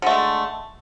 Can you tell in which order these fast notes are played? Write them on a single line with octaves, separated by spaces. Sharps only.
D3 A3 G#3